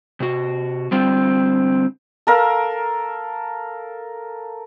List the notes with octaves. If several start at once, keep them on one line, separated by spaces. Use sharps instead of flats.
C3 F#4
D3 G3 C4 F4 G5
A4 A#4 F5